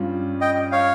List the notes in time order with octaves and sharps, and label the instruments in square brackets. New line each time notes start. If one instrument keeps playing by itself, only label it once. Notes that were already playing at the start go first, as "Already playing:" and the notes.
Already playing: [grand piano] G2 G3 C#4 F4
[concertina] D#5 G5
C#5 F5